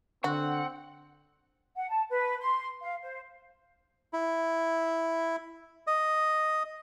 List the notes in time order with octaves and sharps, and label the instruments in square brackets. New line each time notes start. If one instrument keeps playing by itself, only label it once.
[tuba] D3 [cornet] C4 [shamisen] F#4 [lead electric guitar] F#5
[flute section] F#5
A5
B4
C6
F5
C5
[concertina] E4
D#5